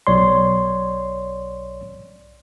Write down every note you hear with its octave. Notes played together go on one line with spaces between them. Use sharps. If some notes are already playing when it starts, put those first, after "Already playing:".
B1 C#5 D5 C6